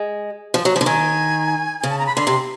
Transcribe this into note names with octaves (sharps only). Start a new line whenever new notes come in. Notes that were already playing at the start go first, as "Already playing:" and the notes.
Already playing: G#3
F3
F#3
F3
D3
D#3 G#5
C#3 G#5
A5
A#5
B5
D3 C6
C3